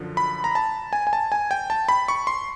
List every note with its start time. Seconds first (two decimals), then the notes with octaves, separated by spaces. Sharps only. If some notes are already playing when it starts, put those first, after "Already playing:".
Already playing: F#2 D3 F3
0.17 B5
0.44 A#5
0.55 A5
0.93 G#5
1.07 G#5
1.13 A5
1.32 G#5
1.51 G5
1.70 A5
1.89 B5
2.08 C#6
2.27 C6